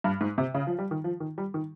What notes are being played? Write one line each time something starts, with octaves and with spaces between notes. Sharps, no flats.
G2
G#2
C3
C#3
F3
G3
D#3
F3
D#3
G3
D#3